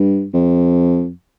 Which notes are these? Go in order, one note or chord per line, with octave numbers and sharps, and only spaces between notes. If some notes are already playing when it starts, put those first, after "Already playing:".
Already playing: G2
F2